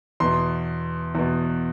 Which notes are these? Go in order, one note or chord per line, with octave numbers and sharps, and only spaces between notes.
E2 B2 C6
E2 B2